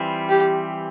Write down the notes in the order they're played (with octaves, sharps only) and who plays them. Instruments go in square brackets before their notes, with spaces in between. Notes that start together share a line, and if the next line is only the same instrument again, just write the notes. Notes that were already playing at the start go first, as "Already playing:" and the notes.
Already playing: [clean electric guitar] E3 G3 C4 F4
[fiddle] G4